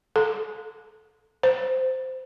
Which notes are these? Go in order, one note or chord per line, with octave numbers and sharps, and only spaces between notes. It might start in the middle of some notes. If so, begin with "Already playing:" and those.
A4
C5